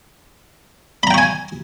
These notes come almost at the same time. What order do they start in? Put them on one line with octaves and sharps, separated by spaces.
B5 A#5 G5 C#6 G#5